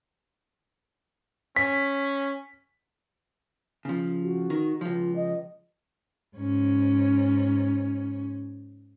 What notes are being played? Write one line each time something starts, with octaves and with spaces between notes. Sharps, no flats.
C#4 B6
C#3 F3
F#4
D#3
C#2 F3 F4
D#5
G#2 C#4